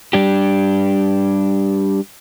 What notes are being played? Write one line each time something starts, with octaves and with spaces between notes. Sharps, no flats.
G3 D4 G4